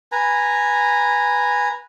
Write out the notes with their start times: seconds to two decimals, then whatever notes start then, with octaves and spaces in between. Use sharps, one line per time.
0.12 B4 G#5 A#5